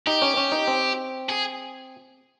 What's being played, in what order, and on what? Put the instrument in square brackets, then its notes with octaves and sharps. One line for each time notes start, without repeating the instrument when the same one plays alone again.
[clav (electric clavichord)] D#4 [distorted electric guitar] G4
[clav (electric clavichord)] C#4
C#4
D#4
C4
[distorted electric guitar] G#4